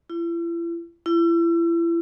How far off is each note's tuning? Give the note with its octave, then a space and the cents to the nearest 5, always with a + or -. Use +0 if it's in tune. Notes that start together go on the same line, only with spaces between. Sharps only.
E4 +40
E4 +35